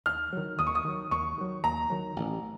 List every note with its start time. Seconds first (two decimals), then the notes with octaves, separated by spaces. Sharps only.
0.06 D#2 F6
0.33 D#3 F#3
0.59 D#2 D#6
0.67 C#6
0.75 D#6
0.85 D#3 F#3
1.11 D#2 C#6
1.38 D#3 F#3
1.64 D#2 A#5
1.90 D#3 F#3
2.16 A1